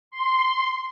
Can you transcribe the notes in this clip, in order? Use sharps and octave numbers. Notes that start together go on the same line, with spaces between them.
C6